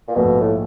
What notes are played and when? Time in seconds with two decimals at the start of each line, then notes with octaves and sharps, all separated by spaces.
0.08 A#2
0.15 A#1 G#2 B2 F3 A3
0.40 A2